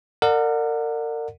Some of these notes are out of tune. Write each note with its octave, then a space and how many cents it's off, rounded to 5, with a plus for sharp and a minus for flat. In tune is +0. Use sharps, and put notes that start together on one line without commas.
A#4 -35 D5 +30 F#5 -20